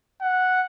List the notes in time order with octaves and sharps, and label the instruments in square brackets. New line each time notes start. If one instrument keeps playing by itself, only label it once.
[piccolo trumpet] F#5